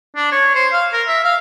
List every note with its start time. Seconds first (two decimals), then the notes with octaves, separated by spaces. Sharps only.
0.15 D4
0.32 C#5
0.55 C5
0.72 F5
0.93 A#4
1.07 E5
1.24 F5